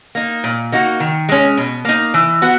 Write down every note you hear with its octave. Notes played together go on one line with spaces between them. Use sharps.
A#3 D#4
A#2
A#3 D#4 F#4
D#3
G#3 C#4
B2
A#3 D#4
E3
B3 F#4